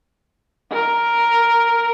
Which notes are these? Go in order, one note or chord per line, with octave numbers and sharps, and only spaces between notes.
A#4